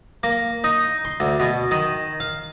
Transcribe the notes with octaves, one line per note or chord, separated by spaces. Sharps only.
A#3
D#4
C6
D2
B2
D#3
F5